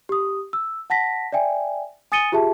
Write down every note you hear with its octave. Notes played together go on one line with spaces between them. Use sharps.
G4 D#6
E6
F#5 A5 A#6 B6
D5 E5 G5 G#5
G#5 D#6 A6 C#7 D#7 G7
F4 G4 G#4 E5 A5